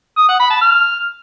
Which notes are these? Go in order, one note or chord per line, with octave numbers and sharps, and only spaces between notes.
D#6
F#5
B5
A5
F6